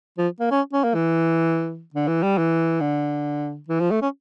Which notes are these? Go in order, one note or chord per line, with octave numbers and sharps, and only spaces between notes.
F3
A#3
C#4
C#4
A#3
E3
D3
E3
G3
E3
D3
E3
F3
A3
C#4